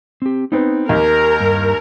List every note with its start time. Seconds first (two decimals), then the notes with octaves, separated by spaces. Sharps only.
0.22 C4 G4
0.52 B3 C4 D#4
0.89 D#2 G4 A#4 D#5
1.40 G2